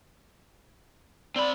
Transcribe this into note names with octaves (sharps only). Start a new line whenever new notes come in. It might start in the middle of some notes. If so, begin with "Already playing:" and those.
C4 D5 B5